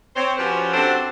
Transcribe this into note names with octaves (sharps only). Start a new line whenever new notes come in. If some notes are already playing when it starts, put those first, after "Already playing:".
C4 C5 C#5
F3 C#4 F#4 G4 B4 C5
C4 D4 F#4 G4 A4 C5